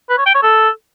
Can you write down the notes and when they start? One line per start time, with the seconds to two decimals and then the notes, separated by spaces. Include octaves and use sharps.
0.10 B4
0.18 C#5
0.26 G5
0.34 C#5
0.43 A4